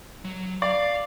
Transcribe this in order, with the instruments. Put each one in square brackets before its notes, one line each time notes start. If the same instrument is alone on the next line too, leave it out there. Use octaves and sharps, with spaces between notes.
[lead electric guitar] F#3
[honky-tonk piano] D5 [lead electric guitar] F5